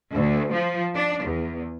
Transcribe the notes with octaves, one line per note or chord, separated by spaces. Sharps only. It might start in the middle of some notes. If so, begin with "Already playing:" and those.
D2
F3
D4
E2